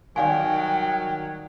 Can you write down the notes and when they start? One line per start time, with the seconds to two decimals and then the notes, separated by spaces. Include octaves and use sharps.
0.16 D#3 F#3 G3 D5 F5 G5 G#5